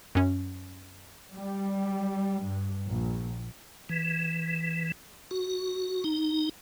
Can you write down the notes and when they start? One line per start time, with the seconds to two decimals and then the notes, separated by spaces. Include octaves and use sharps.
0.15 F#2 C#4
1.33 G3
2.42 G2
2.85 A#1
3.89 E3
5.31 F#4
6.04 D#4